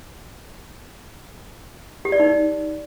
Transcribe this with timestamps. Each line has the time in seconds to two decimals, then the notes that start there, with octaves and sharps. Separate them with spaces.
2.05 G4
2.12 D5
2.20 D#4